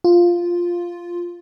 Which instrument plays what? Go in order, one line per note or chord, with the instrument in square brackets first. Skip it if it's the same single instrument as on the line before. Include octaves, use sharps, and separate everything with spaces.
[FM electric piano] F4